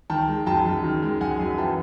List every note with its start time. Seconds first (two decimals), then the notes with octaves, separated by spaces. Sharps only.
0.10 D#3 G5 A5
0.28 G#3
0.46 F#2 G5 A5
0.65 F#2
0.84 D#3
1.03 G#3
1.21 F#2 F#5 G#5
1.39 F#2
1.58 E3 G5 A5